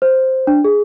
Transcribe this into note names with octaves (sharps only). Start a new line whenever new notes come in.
C5
D4
G#4